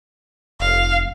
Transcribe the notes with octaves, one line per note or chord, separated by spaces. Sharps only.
F1 F5